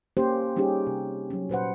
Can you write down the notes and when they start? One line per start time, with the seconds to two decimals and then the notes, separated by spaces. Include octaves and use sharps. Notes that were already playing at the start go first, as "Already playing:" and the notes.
0.17 A#3 C#4 G4 C5
0.56 G3 C#4 D#4 G4 G#4
0.87 C3
1.30 F#3 C#4
1.50 A#2 B4 C5 F#5